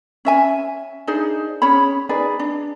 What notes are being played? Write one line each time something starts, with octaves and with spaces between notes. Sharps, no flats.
C#4 E5 G#5
D4 D#4 G#4 C5
C#4 G#4 C#5 B5
D#4 G#4 B4 D5
D4